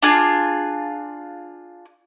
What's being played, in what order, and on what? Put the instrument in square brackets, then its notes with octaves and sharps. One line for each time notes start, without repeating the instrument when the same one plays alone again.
[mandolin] D4 F4 G#4